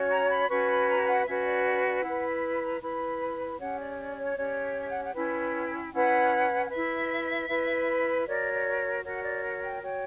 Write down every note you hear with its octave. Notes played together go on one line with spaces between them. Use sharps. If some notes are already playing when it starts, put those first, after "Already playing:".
Already playing: C#4 F#4 C#5
A#5
B5
C#4 F#4 B4 C#6
B5
A#5
E5
F#5
C#4 F#4 B4 E5
E5
D5
D5
D5
E4 B4 F#5
B5
A#5
E4 B4 B5
C#4 G4 C#5 F#5
D5
D5
C#5
C#4 G4 C#5 D5
E5
E5
F#5
F#5
C#4 E4 B4 G5
C#4 E4 B4 F#5
F#5
E4 B4 E5
E4 B4
F#4 A#4 C#5 D5
D5
F#4 A#4 C#5 F#5
D5
F#5
G5
F#4 C#5 G5